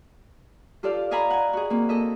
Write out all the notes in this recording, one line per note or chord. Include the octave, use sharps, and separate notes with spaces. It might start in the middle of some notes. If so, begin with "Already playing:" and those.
F4 G4 A4 D5 F5
D5 D#5 F5 G#5 A#5 B5
F#5 G#5
F#4 G#4
A#3 C4
A4 D#5 E5